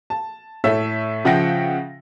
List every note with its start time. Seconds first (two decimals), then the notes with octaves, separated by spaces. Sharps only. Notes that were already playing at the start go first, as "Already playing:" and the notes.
0.10 A5
0.64 A2 A4 C#5 E5 E6
1.25 C#3 F3 E5 F#5 G5 A#6